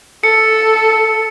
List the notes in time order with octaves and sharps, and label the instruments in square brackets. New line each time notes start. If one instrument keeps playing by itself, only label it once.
[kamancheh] A4 [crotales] C#7